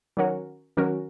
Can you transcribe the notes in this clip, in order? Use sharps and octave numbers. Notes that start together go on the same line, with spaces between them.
D#3 F#3 C#4 F#4 A#4
D#3 F#3 C#4 F#4 A#4